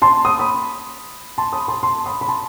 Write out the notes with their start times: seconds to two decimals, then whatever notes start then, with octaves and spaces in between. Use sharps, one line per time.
0.02 A5 C6
0.25 D#6
0.39 B5 D#6
1.38 A5 C6
1.53 B5 D#6
1.68 A5 C6
1.83 A5 C6
2.06 B5 D#6
2.21 B5
2.28 A5 C6